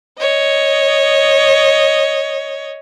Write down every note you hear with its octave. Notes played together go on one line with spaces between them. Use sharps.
C#5 D#5